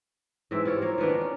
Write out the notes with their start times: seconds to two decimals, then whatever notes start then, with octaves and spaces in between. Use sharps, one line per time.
0.51 G#2 E3 C4 E5
0.65 E4 F4 G4 C#5
0.82 A#3 C4 C#5
0.98 D#3 E3 B3 D4
1.09 A#3
1.21 C#4